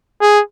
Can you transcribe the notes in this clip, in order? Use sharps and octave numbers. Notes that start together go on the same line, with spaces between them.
G#4